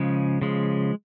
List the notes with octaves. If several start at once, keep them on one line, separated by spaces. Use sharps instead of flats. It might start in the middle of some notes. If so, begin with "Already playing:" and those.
Already playing: C#3 F3 G#3
C#3 F3 G#3